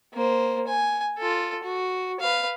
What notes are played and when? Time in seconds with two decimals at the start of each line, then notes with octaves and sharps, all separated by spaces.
0.13 A#3 C5
0.67 G#5
1.18 F4 A4
1.63 F#4
2.20 B4 F5